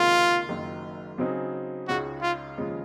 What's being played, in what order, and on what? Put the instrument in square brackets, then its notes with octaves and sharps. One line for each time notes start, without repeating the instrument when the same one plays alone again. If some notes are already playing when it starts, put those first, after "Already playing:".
Already playing: [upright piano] C#2 C3 D#3 A#3 [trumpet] F4
[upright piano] F#1 F#2 D#3
C#3 F#3 C4 D#4 G#4
[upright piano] C#2 C#3 G#3 D#4 [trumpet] F#4
[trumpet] F4
[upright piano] D#2 C#3 F3 G#3